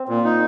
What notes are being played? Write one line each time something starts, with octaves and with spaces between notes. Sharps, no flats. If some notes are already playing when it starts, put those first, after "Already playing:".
Already playing: C4
A#2
D#4